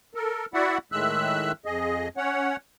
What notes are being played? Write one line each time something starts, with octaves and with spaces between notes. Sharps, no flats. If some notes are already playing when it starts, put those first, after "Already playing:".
A4 A#4
E4 F#4 D5 E5 F#5
A2 D#3 G#3 E5 E6 F#6
F2 G#4 D#5
C#4 C#5 F#5